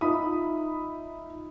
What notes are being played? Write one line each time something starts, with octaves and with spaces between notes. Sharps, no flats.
D#4 F4 E5 B5 D#6